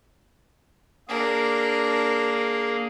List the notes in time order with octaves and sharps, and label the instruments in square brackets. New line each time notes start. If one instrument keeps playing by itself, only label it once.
[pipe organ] A#3 G#4 [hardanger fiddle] D4 A#4